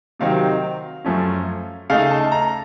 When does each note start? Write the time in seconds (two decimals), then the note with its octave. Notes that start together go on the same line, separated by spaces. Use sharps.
0.20 C3 D#3 F#3 C4 D#4 F5
1.04 F#2 F3 A3 C#4
1.90 C#3 A3 D#4 F5
2.11 A5
2.32 A#5